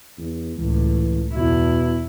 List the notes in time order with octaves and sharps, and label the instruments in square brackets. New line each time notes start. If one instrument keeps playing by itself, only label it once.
[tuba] E2
[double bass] C#2 A2 [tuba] E3
[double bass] E2 E4 [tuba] B2